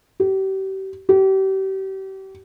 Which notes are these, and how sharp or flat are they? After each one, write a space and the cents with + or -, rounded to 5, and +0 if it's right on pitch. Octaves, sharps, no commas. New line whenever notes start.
G4 -35
G4 -35